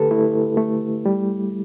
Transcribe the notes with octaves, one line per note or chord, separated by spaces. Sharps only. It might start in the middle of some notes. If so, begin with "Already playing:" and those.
Already playing: D3 A3 G4 A4 B4
A3 E4
A3
G3